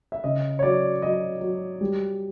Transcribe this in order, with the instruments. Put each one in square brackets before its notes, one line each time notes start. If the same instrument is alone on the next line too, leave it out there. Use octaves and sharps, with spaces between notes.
[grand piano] E5
C#3 D#5
C#5
F#3 D5
F#3 D#5
F#3
G3